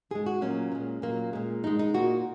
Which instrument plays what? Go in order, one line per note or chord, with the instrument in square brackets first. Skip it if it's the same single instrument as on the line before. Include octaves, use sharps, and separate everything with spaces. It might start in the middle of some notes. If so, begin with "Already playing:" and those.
[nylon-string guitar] G#2 G#3 G#4
F#4
A#2 F#3 A#3 C#4
A#2 G#3
A#2 F#3 A#3
A#2 G#3
G#2 G#3 D#4
D#4
A#2 A#3 F#4